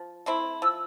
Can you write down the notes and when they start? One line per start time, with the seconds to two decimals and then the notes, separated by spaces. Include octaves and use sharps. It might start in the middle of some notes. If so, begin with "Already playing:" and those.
Already playing: F3
0.26 A3 C4 E4
0.62 F3 E6